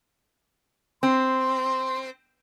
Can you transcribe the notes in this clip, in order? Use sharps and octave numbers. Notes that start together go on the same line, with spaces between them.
C4 C6